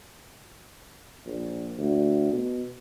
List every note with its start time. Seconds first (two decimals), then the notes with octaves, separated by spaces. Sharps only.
1.26 A#1
1.78 D2
2.32 B2